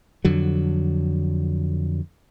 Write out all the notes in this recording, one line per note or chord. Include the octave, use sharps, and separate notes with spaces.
F2 D3 F#3